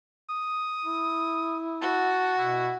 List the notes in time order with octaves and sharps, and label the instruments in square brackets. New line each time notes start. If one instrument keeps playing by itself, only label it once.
[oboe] D#6
[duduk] E4
[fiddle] F#4 [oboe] A5
[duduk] B2 [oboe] E4